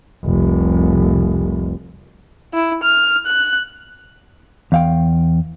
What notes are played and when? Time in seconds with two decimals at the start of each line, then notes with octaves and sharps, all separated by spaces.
0.24 F1 C2
2.54 E4
2.83 F6
3.26 F#6
4.72 E2 F5 G5